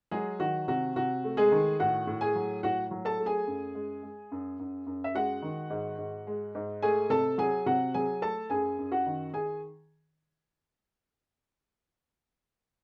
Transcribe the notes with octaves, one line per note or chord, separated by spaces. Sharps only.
F#3 G#3 G#4
D#3 F#4
C3 F#4
C3 F#4
A3
G#3 G#4
D#3
A2 F#4 F#5
A2
G#4 G#5
F#3
A2 F#4 F#5
F#3
A4 A5
A3
G#4 G#5
F#2
G#3
G#3
F#2
F#2
F#2
E5
G#3 F#4 F#5
D#3
G#2
G#2
G#3
G#2
A3 G#4 G#5
C3 A4 A5
F#3 G#4 G#5
C3 F#4 F#5
F#3 G#4 G#5
A3 A4 A5
F#2 G#4 G#5
F#2
F#4 F#5
D#3
G#4 G#5